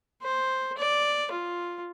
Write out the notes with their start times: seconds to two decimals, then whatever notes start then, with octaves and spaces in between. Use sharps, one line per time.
0.23 C5
0.77 D5
1.32 F4